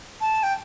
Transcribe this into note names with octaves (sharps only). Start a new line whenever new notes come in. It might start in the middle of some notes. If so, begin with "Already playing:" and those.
A5
G5